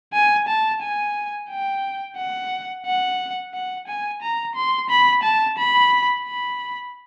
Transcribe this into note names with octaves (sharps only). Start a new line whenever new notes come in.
G#5
A5
G#5
G5
F#5
F#5
F#5
G#5
A#5
C6
B5
A5
B5
B5